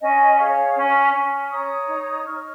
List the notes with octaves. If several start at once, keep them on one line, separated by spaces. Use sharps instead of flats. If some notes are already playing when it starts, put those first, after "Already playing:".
C#4 D#5 G#5
G#4 C#5 F5
C#4
C#4
C#5 A#5 D#6
D#4
D#4 C#6 F6